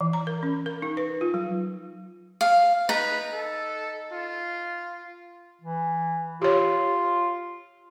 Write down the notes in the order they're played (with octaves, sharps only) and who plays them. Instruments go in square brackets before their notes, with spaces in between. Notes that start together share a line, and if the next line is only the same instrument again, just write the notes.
[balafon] E3
A#5
A#4
C#4
A#4
D#4
B4
F4
F#3
[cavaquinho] F5
[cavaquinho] D#4 A#5 [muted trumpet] B4
[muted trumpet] A4
F4
[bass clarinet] E3
[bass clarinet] F4 [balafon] G4 C#5